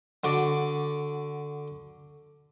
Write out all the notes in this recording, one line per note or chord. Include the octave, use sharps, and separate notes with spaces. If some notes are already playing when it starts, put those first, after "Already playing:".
D3 F#4 D5